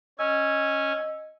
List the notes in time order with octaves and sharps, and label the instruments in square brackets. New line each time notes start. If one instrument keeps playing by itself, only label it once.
[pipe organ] C#4 G#5 [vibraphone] D#5 E6